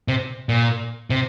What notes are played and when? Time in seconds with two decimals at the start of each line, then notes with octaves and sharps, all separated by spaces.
0.08 C3
0.49 A#2
1.10 C3